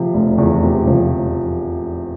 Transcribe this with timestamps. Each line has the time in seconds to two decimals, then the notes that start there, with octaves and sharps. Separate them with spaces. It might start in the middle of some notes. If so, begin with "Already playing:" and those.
Already playing: C3 F3
0.14 F1
0.38 E2
0.63 C3
0.87 F3